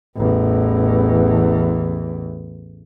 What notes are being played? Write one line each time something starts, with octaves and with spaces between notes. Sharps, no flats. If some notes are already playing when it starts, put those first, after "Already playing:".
A1 E2